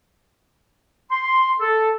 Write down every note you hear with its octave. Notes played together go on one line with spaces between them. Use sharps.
C6
A4